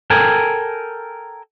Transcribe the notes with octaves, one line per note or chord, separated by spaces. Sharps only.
A4 A#4 G5 G#5